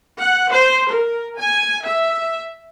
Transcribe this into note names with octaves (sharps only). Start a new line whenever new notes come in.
F#5
C5
A#4
G#5
E5